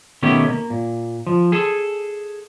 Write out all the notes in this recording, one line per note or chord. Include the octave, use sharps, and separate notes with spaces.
B2 D#3 A3 B3 C#4 G4
A#3
A#2
F3
G#4 A4